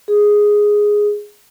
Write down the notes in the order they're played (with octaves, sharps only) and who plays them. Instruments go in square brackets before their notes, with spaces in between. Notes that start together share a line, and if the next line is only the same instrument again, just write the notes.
[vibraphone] G#4